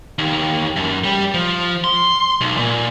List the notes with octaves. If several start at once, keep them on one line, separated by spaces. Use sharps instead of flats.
D#2
F#2
G3
F3
C6
B1
A#2